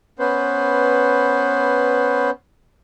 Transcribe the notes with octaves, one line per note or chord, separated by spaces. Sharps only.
B3 C#4 B4 C5